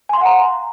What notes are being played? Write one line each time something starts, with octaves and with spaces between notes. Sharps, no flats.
F5 F#5 G#5 A#5 C6